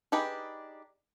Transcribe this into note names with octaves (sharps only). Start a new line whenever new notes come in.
D4 D#4 G4 G#4 B4